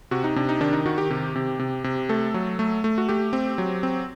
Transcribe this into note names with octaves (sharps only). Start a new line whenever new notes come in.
C3 F#4
D#4
C3 D4
D#4
D#3 D4
D#4
D#3 F#4
G4
C3 G4
C3
C3
C3
A3 A4
F#3
A3
A3
F#4
A3 G4
C4
F#3
C4